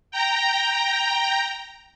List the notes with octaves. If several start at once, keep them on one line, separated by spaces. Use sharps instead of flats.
G5 A#5